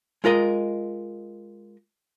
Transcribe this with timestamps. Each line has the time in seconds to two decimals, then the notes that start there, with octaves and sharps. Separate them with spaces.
0.24 G#3 F4 A#4 D#5